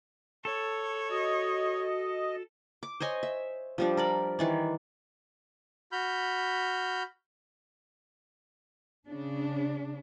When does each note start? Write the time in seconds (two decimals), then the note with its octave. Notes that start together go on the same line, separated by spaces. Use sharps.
0.45 A4 C#5
1.10 F#4 D#5
2.83 D6
3.00 C5 C#5 D#5 G#5
3.23 E5
3.78 F3 G3 D4
3.97 A#4 D5 B5
4.39 D#3 E3 D5
5.92 F#4 B5 F6 G6
9.08 C#3 D4